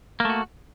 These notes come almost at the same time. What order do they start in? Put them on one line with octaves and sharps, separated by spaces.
A#3 A3 F#4